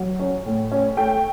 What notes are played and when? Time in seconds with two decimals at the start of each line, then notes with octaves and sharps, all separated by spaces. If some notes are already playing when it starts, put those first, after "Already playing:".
Already playing: F#3
0.20 C#4
0.46 A2
0.72 C#4
0.97 A3 G5